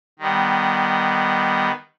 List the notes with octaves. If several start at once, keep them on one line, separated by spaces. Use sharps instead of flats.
D#3 G3 B3